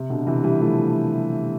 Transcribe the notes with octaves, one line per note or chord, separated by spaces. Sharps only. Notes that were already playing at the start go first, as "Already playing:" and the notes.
Already playing: C3
B2 D3
C3 E3
E3 G3
F3 A3